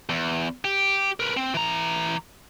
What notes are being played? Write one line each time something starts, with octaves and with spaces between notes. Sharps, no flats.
E2
G4
A#4 B4
C4
E3 A#5